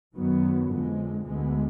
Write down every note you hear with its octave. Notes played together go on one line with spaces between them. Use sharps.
F#2 D#3 F#3 B3
F2 D3 G#3
D2 D3 G#3 B3